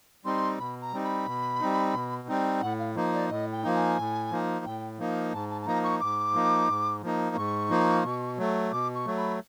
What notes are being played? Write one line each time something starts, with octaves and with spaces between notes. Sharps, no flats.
G3 C4 D#4 C6
B2 B5
A#5
G3 C4 D#4
B5
B2
G3 C4 D#4
B2
G3 C4 D#4
A2 F#5
F5
F3 A#3 D#4 D#5
D5
A2 D#5
G5
F3 A#3 D#4
G#5
A2
F3 A#3 D#4
A2 G5
F3 A#3 D#4
G#2 A5
A5
A5
F3 A#3 D#4 A#5
C#6
G#2 D6
F3 A#3 D#4
G#2
F3 A#3 D#4
G#2 C#6
F3 A#3 D#4
B2
F#3 A3
B2 D6
C#6
F#3 A3
B5